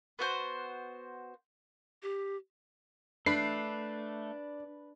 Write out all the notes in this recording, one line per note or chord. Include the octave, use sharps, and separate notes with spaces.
B3 F#4 C5
G4
A3 D4 B4 C7